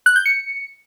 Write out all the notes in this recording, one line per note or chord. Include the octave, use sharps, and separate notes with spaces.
F#6
G6
C#7